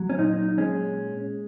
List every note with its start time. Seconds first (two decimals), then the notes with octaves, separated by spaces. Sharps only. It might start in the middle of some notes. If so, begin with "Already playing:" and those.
Already playing: F#3
0.10 C#4
0.19 A#2 D#4
0.58 G#3 C#4